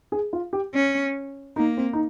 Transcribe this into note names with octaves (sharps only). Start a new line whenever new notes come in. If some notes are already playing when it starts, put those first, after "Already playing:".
G#4
F4
G4
C#4
A#3 D#4
C4
D#4